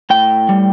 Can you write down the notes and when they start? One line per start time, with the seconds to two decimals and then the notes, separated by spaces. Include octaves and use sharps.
0.10 A2 G5
0.49 G3